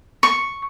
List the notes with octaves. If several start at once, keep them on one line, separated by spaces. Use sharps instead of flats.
C#6